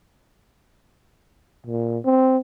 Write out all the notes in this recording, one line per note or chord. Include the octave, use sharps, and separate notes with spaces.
A#2
C4